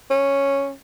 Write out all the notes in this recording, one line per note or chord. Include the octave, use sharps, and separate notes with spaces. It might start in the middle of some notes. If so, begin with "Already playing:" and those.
C#4